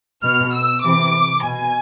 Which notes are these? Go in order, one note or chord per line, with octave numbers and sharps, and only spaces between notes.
B2 F6
E6
C3 E3 D6
B2 G#5